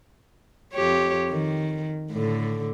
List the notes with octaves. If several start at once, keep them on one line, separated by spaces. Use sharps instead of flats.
F2 G4 C#5
D#3
A2 D3